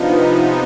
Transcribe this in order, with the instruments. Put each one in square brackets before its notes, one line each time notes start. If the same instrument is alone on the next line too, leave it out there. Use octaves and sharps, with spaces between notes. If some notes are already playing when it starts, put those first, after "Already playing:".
Already playing: [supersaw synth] C3 F3 B3 D#4 [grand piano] D4 F4